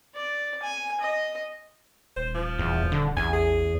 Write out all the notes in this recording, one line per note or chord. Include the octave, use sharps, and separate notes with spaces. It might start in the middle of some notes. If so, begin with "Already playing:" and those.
D5
G#5
D#5
D#1 C5
F3
E2
D3
A1 E2 G#5
G#4